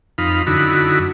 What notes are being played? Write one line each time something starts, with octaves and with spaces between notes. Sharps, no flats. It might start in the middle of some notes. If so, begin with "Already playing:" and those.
F2 D#4 F5 B5
F#2 D3 D#4 E4 F#4 B5